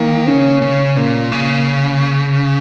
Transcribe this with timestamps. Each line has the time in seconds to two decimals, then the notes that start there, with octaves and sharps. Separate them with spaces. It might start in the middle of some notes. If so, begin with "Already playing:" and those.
Already playing: D#3 A#3
0.27 C#3 C#4
0.62 C#3
0.96 A#2 A#3
1.32 C#3